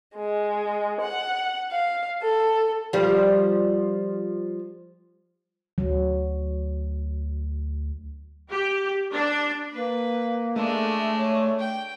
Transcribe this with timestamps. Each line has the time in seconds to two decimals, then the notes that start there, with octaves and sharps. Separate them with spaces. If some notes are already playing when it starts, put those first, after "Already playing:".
0.16 G#3
1.01 F#5
1.71 F5
2.22 A4
2.93 F3 G3
5.78 D2 F#3
8.49 G4
9.13 D4
9.72 A#3 B4
10.56 G#3 A3 D4
11.16 C#5
11.58 G5